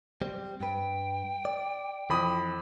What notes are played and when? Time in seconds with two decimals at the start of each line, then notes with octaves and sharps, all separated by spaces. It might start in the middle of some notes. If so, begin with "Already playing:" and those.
0.22 G3 C4
0.60 G2 B4 G5
1.45 D5
2.10 F2 E3 B5 D#6